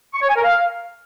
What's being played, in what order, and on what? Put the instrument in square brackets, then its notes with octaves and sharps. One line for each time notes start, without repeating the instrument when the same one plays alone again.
[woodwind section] C#6
C#5
G#5
A#4
F5